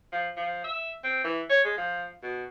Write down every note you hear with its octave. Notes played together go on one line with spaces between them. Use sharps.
F3
F3
E5
C4
E3
C#5
G#3
F3
B2